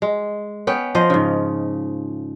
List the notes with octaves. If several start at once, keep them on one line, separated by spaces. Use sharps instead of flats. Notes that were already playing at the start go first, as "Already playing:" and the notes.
G#3
B3 C#4 G5
F3 C5 D#5
G#2 C#3